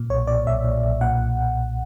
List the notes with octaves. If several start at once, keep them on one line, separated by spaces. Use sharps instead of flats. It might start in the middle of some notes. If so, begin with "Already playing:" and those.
Already playing: A#2
B1 C#5
A#2 D5
B1 E5
A#2
B1
A#2 F#5